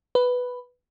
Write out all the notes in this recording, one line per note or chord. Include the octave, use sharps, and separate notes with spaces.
B4